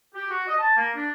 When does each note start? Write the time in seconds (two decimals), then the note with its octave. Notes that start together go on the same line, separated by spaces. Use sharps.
0.14 G4
0.30 F#4
0.47 D#5
0.58 A5
0.76 A#3
0.95 D4